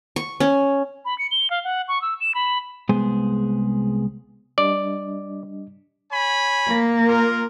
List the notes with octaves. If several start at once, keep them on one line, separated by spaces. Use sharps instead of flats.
C#6
C#4
B5
C#7
G7
F5
F#5
C#6
E6
E7
B5
C2 G#3 B3 G#4 C5
G3 D4 D5 D#5
C#5 G#5 B5
A#3
F4 A#4